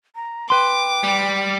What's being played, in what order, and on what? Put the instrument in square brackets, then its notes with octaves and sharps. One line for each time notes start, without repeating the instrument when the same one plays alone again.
[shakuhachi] A#5
[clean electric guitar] B4 C6 [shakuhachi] G5 [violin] D6
[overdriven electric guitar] G3